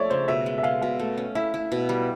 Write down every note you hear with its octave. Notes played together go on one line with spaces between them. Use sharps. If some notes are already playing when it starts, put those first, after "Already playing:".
Already playing: F3 A3 C#5 D5 E5
C#3 C5
B2 E5
G#3
E5
G#3 F5
B2 F5
A3
C#4
E4 E5
E4
B2
G3